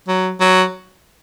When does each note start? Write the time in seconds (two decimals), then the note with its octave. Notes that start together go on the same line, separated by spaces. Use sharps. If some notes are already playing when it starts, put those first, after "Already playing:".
0.08 F#3
0.40 F#3